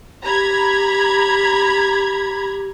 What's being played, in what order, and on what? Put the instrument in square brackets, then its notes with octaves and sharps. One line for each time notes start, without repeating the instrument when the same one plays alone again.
[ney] G4 [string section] A#5 B5 G#6